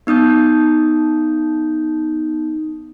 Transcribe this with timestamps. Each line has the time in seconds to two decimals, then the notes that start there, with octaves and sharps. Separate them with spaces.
0.07 B3 D#4 D#6 G6